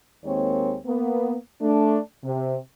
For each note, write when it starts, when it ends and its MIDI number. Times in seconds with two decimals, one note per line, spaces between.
0.25 0.76 39
0.25 0.76 51
0.25 0.76 56
0.25 0.76 58
0.25 0.76 60
0.25 0.76 73
0.86 1.36 58
0.86 1.36 59
1.62 1.99 57
1.62 1.99 62
2.23 2.55 48